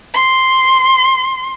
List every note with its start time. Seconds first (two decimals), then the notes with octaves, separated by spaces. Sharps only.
0.14 C6